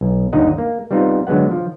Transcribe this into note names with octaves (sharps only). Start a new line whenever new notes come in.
B1
G1 D#2 D3 D#4 D#5 F#5
A#3
G3 B3 C4 D#4 F4
D3 F#3 G#3 B3 F#5
F3